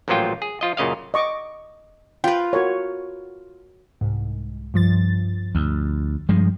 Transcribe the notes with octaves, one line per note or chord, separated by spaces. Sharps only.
A1 A#2 F3 F#3 F4 G5
G#4
F3 F4 D#5
F#2 A#2 C#3 D#5 F5
D#5 C#6 D6
F4 B4 G5
F#4 A#4 C#5
C2 G#2
G2 F3 A6
D2
G2 F3 G#3